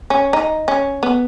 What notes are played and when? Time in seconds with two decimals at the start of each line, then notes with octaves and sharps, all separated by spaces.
0.10 C#4
0.33 D#4
0.68 C#4
1.03 B3